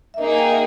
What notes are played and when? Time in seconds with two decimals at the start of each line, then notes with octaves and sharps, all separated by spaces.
0.14 E5
0.18 A#3 D#4 G#4 D#5
0.38 G5
0.50 E5